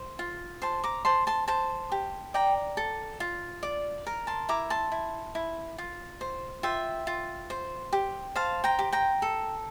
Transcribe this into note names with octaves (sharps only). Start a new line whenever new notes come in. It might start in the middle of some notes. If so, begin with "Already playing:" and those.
Already playing: C5 C6
F4
C5 A5 C6
A#5 D6
C5 A5 C6
A5 C6
C5 A5 C6
G4
D5 G5 A#5
A4
F4
D5
A#4
A5 C6
E4 A#5 D6
A5 C6
E4
E4
F4
C5
F4 E5 G5
F4
C5
G4
C5 F5 A5
G5 A#5
G4
G5 A#5
A4